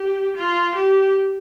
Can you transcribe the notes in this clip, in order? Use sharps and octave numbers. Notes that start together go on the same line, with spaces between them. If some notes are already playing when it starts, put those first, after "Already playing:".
Already playing: G4
F4
G4